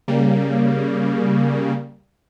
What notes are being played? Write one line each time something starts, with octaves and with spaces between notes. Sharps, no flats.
C#3 G3 A#3